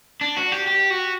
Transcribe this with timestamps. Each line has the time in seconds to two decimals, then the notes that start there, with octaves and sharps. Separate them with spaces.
0.21 D4
0.37 F#4
0.52 G4
0.67 G4
0.90 F#4